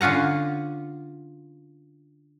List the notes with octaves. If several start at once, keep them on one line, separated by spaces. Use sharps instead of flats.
D3 C#4 F4 F#5 A#5